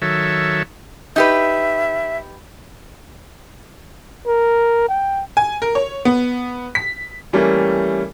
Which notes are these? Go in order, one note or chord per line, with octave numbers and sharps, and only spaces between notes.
D#3 F#3 A4 C#5 E5
D#4 G4 B4 E5
A#4
G5
G#5
A#4
C#5
B3
B6
E3 G3 A3 A#3 C#4